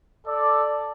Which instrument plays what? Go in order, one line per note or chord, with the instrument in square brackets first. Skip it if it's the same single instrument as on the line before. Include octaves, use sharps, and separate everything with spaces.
[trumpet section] A4 D5